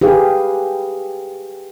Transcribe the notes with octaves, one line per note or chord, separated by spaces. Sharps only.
G4 G#4 B4 F5